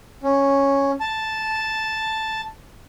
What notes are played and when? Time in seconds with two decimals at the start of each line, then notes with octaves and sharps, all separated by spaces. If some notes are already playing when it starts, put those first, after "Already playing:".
0.23 C#4
1.00 A5